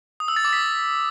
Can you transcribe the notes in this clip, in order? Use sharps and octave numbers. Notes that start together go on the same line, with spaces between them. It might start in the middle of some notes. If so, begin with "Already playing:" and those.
D#6
E6
A6
D6
B6